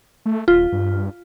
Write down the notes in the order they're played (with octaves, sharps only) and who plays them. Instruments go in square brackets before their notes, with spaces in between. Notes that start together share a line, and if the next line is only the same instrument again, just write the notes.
[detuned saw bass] A3
[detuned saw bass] D#1 [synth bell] F4
[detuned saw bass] G2